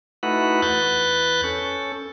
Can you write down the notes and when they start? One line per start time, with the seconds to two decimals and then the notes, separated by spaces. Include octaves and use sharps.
0.23 A3 D#4 E4 F#4 B4 F#5
0.62 E2 B4 F#6 G6 A6
1.44 C#4 A4